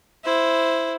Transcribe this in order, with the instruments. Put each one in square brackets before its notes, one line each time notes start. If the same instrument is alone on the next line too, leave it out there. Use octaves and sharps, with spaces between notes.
[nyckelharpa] E4 C5